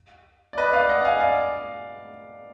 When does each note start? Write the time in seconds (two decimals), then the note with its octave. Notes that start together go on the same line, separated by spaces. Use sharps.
0.53 D5
0.58 B4 D#5
0.73 D5 F5
0.89 D#5 F#5
1.01 F#5
1.05 F5 G#5
1.20 D5 F5